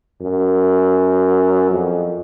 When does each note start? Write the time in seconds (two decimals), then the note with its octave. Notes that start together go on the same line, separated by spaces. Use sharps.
0.21 F#2
1.71 F2